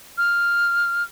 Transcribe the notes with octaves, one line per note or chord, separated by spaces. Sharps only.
F6